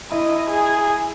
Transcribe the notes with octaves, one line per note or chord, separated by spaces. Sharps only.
E4 D#5
G#4